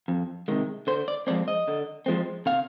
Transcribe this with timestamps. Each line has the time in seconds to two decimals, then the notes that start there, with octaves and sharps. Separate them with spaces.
0.08 F2
0.48 C3 D#3 G#3
0.87 D3 C5
1.08 D5
1.27 F3 G#3 C4 D5
1.48 D#5
1.68 D3
2.06 F3 G#3 C4
2.46 C3 F5